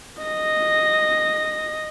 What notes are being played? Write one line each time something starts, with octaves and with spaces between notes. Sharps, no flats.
D#5 A#6